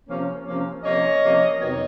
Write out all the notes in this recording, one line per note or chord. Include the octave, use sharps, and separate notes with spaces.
C3 F3 A#3 C#4
C3 F3 A#3 C#4
C3 F3 A#3 C#4 C#5 D#5
C3 F3 A#3 C#4
F2 C3 D#3 F#3 B3 C#5 D#5